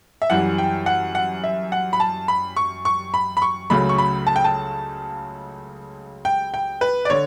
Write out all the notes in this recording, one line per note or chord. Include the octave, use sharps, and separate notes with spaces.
E5
F#2 E3 G3 F#5
G5
F#5
F#5
E5
F#5
B5
A5
B5
C#6
C#6
B5
B5
C#6
C#2 C#3 F#3 A3 B5
C#6
B5
A5
G5
A5
G5
G5
B4
D5
D3 C#5